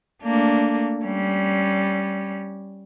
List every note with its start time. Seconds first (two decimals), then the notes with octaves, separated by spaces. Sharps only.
0.23 A3 A#3 D4
1.05 G3 C#4